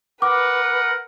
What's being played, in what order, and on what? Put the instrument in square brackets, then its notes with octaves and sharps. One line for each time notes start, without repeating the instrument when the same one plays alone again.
[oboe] A#4 [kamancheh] B4 [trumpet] F#5 [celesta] D6